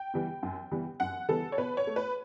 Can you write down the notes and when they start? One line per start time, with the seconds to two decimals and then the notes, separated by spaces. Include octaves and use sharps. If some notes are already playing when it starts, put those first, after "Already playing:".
Already playing: G5
0.14 E3 G3 B3
0.43 F#2
0.71 E3 G3 B3
1.00 F#2 F#5
1.29 E3 G3 B3 A4
1.52 C#5
1.58 B2 B4
1.77 C#5
1.87 A3
1.96 B4